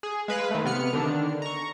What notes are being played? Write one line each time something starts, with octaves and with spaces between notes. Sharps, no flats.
G#4
G#3 B4 F5
D#3 A3
C3 B3 F6 C#7
D3 D#3 D4
A#5 C#6